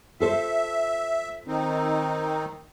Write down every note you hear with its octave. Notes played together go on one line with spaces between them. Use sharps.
F4 A4 C5 E5
D#3 C4 D#4